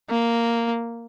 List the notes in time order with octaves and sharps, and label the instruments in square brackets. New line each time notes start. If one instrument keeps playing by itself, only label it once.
[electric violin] A#3